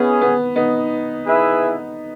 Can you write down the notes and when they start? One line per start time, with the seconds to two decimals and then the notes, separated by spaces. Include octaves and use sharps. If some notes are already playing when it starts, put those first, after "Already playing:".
Already playing: B3 C#4 E4 G#4
0.22 B3
0.56 B3 D#4
1.26 E4 G#4 B4 E5